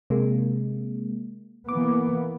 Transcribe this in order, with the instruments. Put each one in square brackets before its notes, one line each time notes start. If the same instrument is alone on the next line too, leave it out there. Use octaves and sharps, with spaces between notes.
[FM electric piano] C3 G#3 A#3
[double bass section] E3 A#3 B3 [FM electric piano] D6